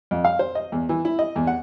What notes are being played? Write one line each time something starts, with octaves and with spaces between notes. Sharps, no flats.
F2
F5
C5
D#5
E2
E3
E4
D#5
E2
F#5